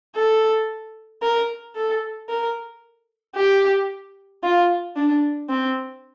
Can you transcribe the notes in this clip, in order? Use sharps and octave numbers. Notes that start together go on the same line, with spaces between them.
A4
A#4
A4
A#4
G4
F4
D4
C4